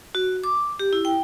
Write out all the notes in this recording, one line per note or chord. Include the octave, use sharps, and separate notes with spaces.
F#4
D6
G4
E4
G5